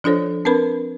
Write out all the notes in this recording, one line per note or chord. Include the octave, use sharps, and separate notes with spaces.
F3 D4 F4 A4 C5 C#5
C4 D4 A#4 B4 B5